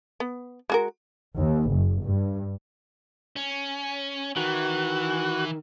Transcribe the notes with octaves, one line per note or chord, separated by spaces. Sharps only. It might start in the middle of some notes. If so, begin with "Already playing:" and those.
B3
G#3 F#4 A#4
D#2
F#1
G2
C#4
D#3 E3 F#4